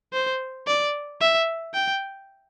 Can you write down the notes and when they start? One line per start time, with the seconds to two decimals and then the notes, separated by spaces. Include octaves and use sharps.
0.13 C5
0.67 D5
1.21 E5
1.74 G5